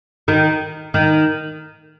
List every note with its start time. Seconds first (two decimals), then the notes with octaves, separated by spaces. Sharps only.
0.28 D#3
0.94 D#3